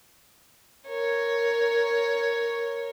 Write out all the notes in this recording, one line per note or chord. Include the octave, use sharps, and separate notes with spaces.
A#4 C#5